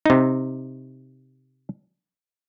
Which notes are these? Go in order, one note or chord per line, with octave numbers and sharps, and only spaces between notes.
C3 D#4